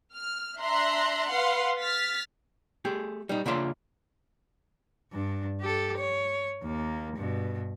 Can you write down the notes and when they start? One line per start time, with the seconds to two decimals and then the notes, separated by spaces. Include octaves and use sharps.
0.14 F6
0.58 D4 E5 A#5 C6 F#6
1.31 B4 F5 F#5 C6
1.81 F6 A6 B6
2.85 A3 G4 G#4
3.29 G3 D#4
3.46 C#3 A#3 D4 F4 E5 C6
5.12 G2 D4
5.60 G4 A4
5.97 C#5
6.62 D#2 A#3
7.16 G2 B2